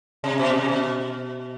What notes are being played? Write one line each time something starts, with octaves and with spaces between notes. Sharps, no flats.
C3
B2
C3
B2